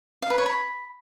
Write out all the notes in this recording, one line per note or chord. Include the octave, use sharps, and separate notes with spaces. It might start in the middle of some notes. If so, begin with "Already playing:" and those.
F5
B4
C#5
B5